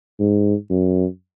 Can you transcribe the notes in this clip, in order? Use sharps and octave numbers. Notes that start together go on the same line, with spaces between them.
G#2
F#2